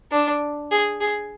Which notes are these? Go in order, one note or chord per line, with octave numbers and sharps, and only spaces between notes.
D4
G#4
G#4